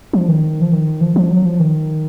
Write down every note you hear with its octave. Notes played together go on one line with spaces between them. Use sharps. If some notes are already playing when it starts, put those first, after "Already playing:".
F3
D#3
F3
D#3
F3
F3
F#3
F3
D#3